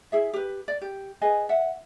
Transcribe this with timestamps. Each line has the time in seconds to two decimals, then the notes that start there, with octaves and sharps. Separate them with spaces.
0.12 E4 G#4 E5
0.34 G4 B4
0.68 D5
0.81 G4
1.22 G#4 B4 D#5 G#5
1.49 E5 F#5